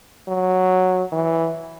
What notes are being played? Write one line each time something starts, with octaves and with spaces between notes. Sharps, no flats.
F#3
E3